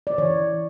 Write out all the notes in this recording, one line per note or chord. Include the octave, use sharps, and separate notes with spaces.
D5
E3 C#5